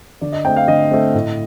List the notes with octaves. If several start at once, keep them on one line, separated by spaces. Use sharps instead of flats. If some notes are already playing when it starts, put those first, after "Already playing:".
D3 D5
D#5
A3 C4 G5
F5
D3 D#5
A3 C4
A2